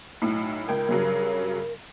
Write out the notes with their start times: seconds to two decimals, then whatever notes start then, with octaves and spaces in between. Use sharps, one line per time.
0.22 B1 A2
0.68 C#2 A#4 G5 G#6
0.89 G2 C#3 F#3